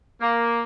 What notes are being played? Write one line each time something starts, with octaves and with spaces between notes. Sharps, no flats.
A#3